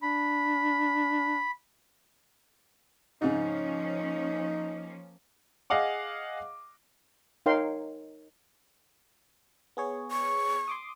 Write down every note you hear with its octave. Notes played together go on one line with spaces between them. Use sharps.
D4 B5
G#2 C#3 F3 A#3 C#4 D#4
G#4 D#5 F5 F#5 D6
D#4 A#4 C#5 F5 G5 C6
B3 G#4 C#5
C#6
C6 D6 D#6